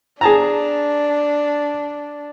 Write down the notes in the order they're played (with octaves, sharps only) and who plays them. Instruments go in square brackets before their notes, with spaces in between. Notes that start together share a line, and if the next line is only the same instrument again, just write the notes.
[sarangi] D4 [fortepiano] G#4 A5 A#5